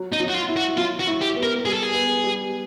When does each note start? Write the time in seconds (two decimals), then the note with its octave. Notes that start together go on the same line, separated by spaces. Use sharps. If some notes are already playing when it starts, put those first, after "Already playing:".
Already playing: F#3
0.12 D#4
0.20 F#3
0.28 F#4
0.34 F4
0.48 E4
0.56 F#4
0.78 F#3 F4
1.00 F#4
1.07 E4
1.22 G4
1.36 B3
1.43 A#4
1.66 G3 G#4
1.74 A4
1.83 G#4
1.94 B3
2.24 G3